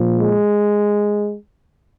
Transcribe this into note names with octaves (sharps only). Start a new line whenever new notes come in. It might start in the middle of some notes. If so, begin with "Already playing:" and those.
Already playing: A#2 F3
G#3